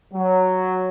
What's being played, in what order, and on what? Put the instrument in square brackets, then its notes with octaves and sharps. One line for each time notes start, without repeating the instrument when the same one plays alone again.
[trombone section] F#3